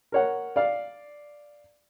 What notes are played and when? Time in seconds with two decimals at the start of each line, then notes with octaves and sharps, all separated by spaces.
0.12 A#4 C#5 F#5
0.56 D5 F5